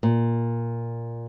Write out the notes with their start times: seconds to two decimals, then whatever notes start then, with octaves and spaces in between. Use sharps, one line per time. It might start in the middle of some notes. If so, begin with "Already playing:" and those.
0.03 A#2